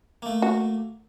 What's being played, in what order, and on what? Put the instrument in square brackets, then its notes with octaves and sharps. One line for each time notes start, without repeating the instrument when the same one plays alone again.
[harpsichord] A3 A#3
[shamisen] F#4